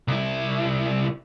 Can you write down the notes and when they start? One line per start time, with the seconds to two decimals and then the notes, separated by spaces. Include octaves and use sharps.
0.08 C2 E4